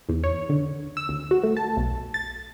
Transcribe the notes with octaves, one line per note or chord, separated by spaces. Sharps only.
E2
C#5
D3
E6
D2
F#4
A3
A5
B1
A6